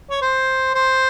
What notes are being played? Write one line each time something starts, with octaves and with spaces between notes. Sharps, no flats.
C#5
C5
C5